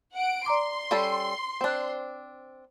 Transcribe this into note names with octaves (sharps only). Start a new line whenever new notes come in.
F#5 D7
D5 A#5 C6 D6
G3 C#4 A4
C4 D4 C5 F#6